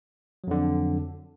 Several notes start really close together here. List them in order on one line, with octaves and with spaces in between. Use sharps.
F#3 F2 D3